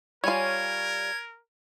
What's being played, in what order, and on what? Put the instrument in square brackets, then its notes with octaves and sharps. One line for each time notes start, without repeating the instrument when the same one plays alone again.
[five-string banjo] G3 F4 [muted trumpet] A#4 [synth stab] C#5 G#5 [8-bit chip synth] G#6